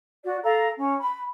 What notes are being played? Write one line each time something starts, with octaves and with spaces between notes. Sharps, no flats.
F#4 D5
A4 F5 A#5
C#4
B5